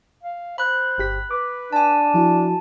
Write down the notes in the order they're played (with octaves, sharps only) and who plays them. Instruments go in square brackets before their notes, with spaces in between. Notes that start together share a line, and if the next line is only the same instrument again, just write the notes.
[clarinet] F5
[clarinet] C5 [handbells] B5 F#6
[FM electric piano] G1 G4 B6
[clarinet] B4 [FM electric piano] D6
[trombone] D4 [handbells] G#5 A5
[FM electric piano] F3 E4 F#4